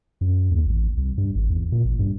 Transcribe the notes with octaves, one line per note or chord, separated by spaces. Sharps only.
F#2
D#2
A1
C2
G2
G#1
E2
A#2
A1
G2